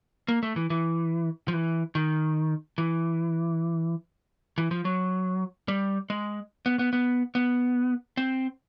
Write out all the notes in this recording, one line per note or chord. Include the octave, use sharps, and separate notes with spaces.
A#3
A3
E3
E3
F3
E3
D#3
E3
E3
F3
F#3
G3
G#3
B3
B3
B3
B3
C4